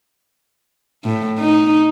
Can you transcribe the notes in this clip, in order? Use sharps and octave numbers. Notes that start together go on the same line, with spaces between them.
A2
D#4